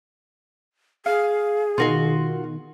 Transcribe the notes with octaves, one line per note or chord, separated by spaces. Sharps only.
G#4 F5
B2 D#3 F4 F#4 C6